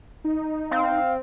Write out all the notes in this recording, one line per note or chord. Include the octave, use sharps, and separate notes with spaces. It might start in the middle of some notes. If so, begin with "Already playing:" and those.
D#4
C4 F5